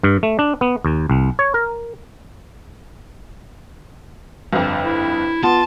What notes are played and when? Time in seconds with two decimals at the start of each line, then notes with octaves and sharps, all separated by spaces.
0.03 G2
0.23 A3
0.39 D4
0.61 B3
0.85 D#2
1.10 C2
1.39 C#5
1.54 A#4
4.53 G1 F2
4.83 E4
5.43 B3 F4 A5